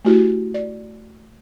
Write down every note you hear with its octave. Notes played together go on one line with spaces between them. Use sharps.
A3 E4 F#4 G4
D5